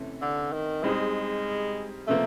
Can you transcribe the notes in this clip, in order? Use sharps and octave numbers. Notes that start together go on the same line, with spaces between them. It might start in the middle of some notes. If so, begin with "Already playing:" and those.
Already playing: C3 E3 A3 C#4
D3
D#3
G3 G#3 C4 D#4 G#4
C3 F3 A3 A#3